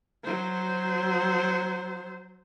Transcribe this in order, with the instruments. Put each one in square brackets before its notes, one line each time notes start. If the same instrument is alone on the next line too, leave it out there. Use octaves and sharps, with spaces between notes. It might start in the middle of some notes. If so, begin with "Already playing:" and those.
[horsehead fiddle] F#3 C5